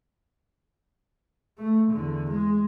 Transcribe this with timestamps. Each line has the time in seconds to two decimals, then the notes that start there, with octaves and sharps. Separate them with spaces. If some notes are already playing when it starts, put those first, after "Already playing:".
1.58 A3
1.91 E2 D3
2.30 G#3